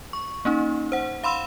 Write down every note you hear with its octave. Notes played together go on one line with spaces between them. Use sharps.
C#6
A#3 C#4 D#4
C5 F#5
F5 B5 C6 E6 E7